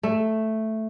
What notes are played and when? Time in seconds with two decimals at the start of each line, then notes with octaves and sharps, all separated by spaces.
0.03 A3